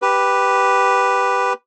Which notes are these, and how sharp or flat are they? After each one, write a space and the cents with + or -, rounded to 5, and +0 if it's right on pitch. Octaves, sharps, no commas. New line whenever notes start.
G4 +0 B4 +0